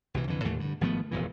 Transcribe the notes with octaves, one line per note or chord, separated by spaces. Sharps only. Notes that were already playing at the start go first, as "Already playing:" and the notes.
C2 B2 E3
F2 D3 E3
D#2 A2 E3 A3
G2 D3
G#1 F3 A3 B3
E1 F2 A#2 E3